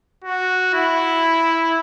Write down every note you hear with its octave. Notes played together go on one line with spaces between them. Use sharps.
F#4
E4